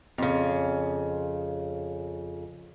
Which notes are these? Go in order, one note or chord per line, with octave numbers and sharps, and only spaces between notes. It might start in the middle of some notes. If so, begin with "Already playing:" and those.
F2 C#3